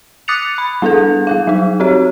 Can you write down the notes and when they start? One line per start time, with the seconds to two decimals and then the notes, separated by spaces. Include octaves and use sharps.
0.28 D6 D#6 F#6 A6 C#7 F7
0.58 B5
0.82 G3 B3 D4 G#4 A4
1.27 G3 G#4 F5
1.47 F#3 D#4
1.80 C4 F#4 G4 C#5